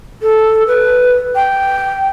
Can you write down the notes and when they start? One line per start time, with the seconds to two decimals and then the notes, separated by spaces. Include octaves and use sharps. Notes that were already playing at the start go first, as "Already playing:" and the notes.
0.22 A4
0.67 B4
1.36 G5